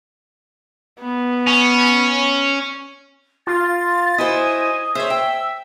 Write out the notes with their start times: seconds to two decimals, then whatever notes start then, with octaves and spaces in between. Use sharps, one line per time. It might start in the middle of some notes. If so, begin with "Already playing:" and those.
1.00 B3
1.47 C#4
3.47 F4 A6
4.18 E4 F#4 C5 D#5 G#5
4.95 G#4 C5 C#5 E5
5.10 G5 E6